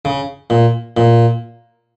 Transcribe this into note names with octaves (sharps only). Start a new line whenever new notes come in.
C#3
A#2
A#2